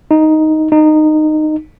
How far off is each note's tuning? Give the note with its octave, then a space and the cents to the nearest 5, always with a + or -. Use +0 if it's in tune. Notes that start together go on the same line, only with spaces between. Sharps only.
D#4 +5
D#4 -15